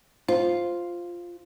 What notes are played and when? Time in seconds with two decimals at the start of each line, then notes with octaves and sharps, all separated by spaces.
0.28 F4 C5